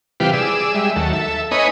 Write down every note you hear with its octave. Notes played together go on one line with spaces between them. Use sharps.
C3 E3 G3 F4 G4 B4
G#4 D5 E6
G3 G#3 E5
D#2 F#3 A4
A4 E5
B3 D#4 C#5 D#5 G#5 B5